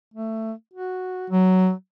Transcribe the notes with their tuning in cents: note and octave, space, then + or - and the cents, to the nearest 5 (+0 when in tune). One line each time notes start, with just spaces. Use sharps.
A3 +15
F#4 -5
F#3 +10